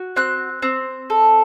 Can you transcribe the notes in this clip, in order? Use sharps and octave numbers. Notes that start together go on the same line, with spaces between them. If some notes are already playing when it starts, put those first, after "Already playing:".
Already playing: F#4
C4 F#6
C4
A4